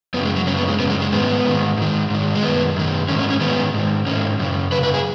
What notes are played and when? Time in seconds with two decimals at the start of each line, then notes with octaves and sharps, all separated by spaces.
0.14 F#2 B3
0.18 C#3
0.25 G#3
0.36 F#3
0.47 F#2 C#3 C#4
0.58 B3
0.69 G#3
0.79 C#3 B3
0.83 F#2
0.90 G#3
1.01 G#3
1.12 G#2 D#3 B3
1.45 G#2 D#3
1.77 G#2 D#3
2.10 G#2 D#3
2.35 G#3
2.43 F#2 D#3 B3
2.76 F#2 D#3
3.08 G#2 D#3 C#4
3.19 C#4
3.30 C#4
3.41 G#2 D#3 B3
3.74 G#2 D#3
4.06 G#2 D#3 C#4
4.39 F#2 C#3
4.72 F#2 C#3 B4
4.83 B4
4.94 G#4